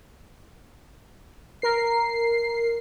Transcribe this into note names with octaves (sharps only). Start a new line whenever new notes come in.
A#4 C7